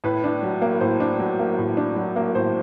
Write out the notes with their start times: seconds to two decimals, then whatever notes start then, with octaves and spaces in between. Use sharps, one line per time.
0.04 A2 B4
0.24 D4
0.43 F#3
0.62 A#3
0.80 A2 C5
1.00 D4
1.19 F#3
1.39 A#3
1.58 A2
1.77 D4
1.96 F#3
2.16 A#3
2.35 A2 C5